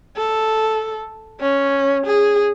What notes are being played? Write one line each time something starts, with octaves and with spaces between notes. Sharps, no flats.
A4
C#4
G#4